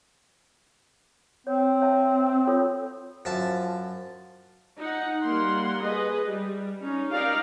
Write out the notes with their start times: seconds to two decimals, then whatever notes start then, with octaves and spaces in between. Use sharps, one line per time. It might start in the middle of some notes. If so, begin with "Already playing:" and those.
1.47 C4 C#5
1.82 C#5 E5 A5
2.47 F4 A4 C#5
3.25 F#2 F3 E5 A5
4.78 D#4 F#5
5.23 G3 A#3 F#5 C6
5.83 G#4 B4 D#5
6.26 G3
6.81 C#4 D#4
7.11 D#4 G4 A#4 D5 F5